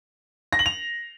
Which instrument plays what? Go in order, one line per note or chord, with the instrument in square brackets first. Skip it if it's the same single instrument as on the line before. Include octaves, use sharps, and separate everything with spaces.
[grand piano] A#6
F#7
F7